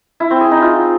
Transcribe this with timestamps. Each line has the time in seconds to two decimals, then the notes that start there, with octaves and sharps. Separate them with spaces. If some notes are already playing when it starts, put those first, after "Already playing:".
0.20 E4
0.31 C4
0.41 G#4
0.51 D#4
0.62 F4